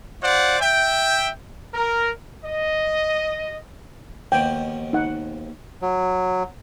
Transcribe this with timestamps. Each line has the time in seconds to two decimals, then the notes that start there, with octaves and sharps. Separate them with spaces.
0.22 F4 C5 D5 F#5
0.60 E5 G5
1.74 A#4
2.44 D#5
4.32 D#2 B2 F3 G5
4.93 D#4 F#5
5.82 F#3